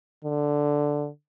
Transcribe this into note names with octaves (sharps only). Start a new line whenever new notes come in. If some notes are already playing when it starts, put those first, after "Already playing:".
D3